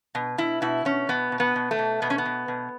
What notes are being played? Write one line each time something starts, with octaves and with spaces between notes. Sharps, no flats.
B2
B2 E4
B2 E4
B2 C#4
B2 B3
B2
B3
B2
A3
B2
B2 B3
C#4
B3
B2
B2